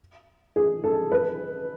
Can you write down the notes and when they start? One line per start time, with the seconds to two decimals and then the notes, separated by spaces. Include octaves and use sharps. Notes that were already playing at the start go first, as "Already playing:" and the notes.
0.56 G#4
0.84 A4
1.12 B4